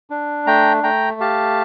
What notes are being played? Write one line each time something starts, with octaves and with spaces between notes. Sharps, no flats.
D4
A3 G5 A#5
A3 G5 A#5
G4 F5 A5